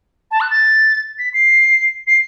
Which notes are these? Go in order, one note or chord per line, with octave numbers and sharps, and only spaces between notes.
A5
F#6
A6
B6
C7
C7